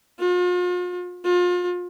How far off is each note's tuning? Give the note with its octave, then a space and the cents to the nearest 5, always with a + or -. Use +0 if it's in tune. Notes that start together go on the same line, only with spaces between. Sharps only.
F4 +40
F4 +35